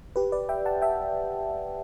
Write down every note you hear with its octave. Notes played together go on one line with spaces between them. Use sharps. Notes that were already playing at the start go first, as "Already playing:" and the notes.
G4 B4
B4 D5
E5 G5
F#5 A5
E5 G5